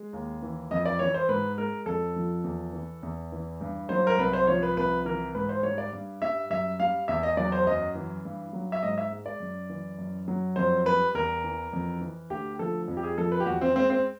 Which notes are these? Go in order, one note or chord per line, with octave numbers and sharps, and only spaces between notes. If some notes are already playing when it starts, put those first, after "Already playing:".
Already playing: G#3
D#2
E3
F2 D#5
D5
E3 C#5
C5
G#2 B4
G#3 A#4
F2 A4
F3
E2
E3
E2
E3
G2
F#3 C5
A#4
C2 B4
C5
F3 C#5
B4
C2 B4
E3 A#4
G#2 B4
C5
G3 C#5
D5
G2
G3 E5
F#2 E5
G3 F5
E2 E5
D#5
F#3 D5
C5
F#2 D#5
E3
G2
F#3
E5
G#2 D#5
E5
G#3
D5
F#2
E3
F#2
F#3
F2 C5
G3 B4
E2 A#4
E3
F2
E3
D2 G4
F3 A4
F2
G4
G#4
F3 A4
B4
G4
E2 F#4
C4
G#3 C4
C4